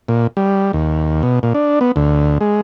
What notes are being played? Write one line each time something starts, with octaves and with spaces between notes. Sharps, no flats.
A#2
G3
D#2
B2
A#2
D4
B3
D2
G#3